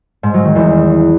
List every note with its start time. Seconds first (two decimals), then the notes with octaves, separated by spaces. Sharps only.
0.23 G#2
0.34 F#3
0.45 D#3
0.55 E2